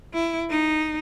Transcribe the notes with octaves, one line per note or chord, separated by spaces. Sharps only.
E4
D#4